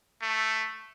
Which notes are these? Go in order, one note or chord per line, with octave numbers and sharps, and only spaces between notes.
A3